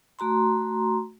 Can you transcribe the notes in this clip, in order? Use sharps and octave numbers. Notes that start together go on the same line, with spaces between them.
A3 F#4 A#5 C6